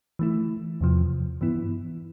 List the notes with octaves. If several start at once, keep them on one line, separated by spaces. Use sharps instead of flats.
E3 A3 E4
E2 C3 F3
G2 E3 B3 E4